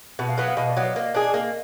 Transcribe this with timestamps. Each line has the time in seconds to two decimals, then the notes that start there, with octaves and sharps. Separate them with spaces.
0.19 B2 F#5
0.29 F5
0.38 F#3 B3 F#5
0.48 F5
0.57 B2 D#5
0.70 D5
0.77 F#3 B3
0.83 F5
0.96 A#3 D#5
1.15 D4 G#4
1.34 A#3